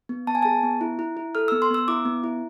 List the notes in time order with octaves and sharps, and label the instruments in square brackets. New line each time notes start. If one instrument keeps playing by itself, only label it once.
[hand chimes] B3
B3 A5
G#5
G#4 A5
B3
E4
E4
E4
A4 F6
E6
B3
C6
B3 E6
E4 D6
B3
E4